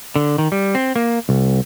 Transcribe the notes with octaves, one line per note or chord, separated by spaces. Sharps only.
D3
D#3
G3
C4
A#3
C2